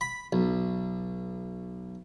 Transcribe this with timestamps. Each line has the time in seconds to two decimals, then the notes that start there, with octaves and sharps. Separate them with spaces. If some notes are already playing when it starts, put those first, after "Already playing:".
0.01 B5
0.33 B1